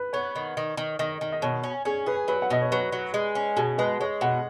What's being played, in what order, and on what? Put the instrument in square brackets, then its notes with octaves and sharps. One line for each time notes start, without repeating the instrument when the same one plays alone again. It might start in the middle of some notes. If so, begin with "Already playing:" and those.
Already playing: [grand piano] B4
[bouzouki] B3 [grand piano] C#5
[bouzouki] D#3
D#3
D#3
[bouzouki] D#3 [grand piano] D#5
[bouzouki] D#3
[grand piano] D#5
[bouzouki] B2 [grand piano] C#5
[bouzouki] C#4
[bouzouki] C#4 [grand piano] G#4
[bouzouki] G#4 [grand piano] B4
[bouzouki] F#3 [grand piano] B4
[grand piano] F#5
[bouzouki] B2 [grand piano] D#5
[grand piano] C#5
[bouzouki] F#3 [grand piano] B4
[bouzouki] F#3
G#3
C#4
[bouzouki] B2 [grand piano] G#4
[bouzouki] G#3 [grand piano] B4
[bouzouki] G#3 [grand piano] C#5
[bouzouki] B2 [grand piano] F#5